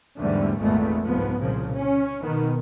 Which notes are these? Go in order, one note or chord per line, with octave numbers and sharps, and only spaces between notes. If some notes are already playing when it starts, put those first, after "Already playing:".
E2 G#2 D3 G3 A3
G#1 E2 A#2 G#3 A3 B3
C2 G#2 F3 B3
C2 A#2 C#3 F3
C#4
B2 D#3 B3